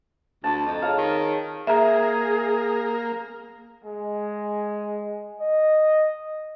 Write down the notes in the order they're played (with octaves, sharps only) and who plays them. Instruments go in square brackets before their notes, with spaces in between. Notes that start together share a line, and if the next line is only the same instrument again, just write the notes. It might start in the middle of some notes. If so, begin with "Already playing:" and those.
[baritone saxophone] D2 [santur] A5
[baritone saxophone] F2 [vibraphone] D#5 A#5
[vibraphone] G#4 C#5 [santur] F5
[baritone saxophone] D#3
[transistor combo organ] A#3 [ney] G#4 [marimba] E5 A#5
[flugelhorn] G#3
D#5